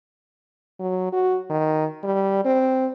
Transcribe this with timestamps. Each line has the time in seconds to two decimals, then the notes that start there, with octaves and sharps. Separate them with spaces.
0.80 F#3
1.13 F#4
1.50 D#3
2.04 G3
2.45 C4